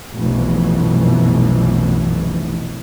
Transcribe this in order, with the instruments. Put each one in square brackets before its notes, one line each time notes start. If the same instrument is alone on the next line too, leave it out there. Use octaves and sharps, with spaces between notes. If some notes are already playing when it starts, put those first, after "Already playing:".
[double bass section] F1 B1 F#2 B2 E3